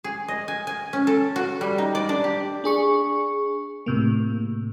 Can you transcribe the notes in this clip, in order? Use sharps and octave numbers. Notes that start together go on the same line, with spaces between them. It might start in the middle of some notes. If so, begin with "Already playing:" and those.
G#4
D#5
G#5
G#5
C#4
A4
F#4
G3
D#4
D5
D4
G4
D4 G#4 C#6
A2 C3 A#3